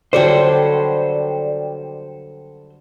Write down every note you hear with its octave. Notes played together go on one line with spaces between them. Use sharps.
D3 F#3 G3 A4 C5 D5 G5